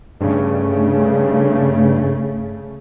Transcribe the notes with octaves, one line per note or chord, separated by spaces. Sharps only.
G2 C#3 A3